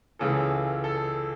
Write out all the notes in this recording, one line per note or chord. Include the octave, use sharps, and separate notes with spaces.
C#2 C#3 E3 A4
A4